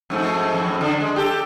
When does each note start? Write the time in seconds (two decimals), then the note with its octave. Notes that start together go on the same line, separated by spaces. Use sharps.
0.10 F2 G#2 A3
0.54 F2 A2
0.81 D3 D4
1.00 G#3
1.16 G4 A4